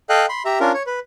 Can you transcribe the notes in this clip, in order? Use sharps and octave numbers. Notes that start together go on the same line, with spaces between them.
A4 D#5 F5 G5 F#6
B5 C6
G4 E5 A#5
C#4 D4 F4 A#4
C#5
B4